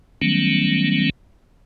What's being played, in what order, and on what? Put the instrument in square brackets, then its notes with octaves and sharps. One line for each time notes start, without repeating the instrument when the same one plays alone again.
[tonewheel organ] D#3 F#3 G3 A3 B3 C#4